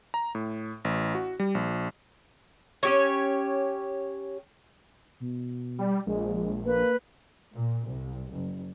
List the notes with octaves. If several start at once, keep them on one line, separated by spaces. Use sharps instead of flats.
A#5
A2
A1
F#4
G3
A#1
C#4 G4 C#5
B2
G3
A#1 G#3
A#3 B4
A#2
C2
F#1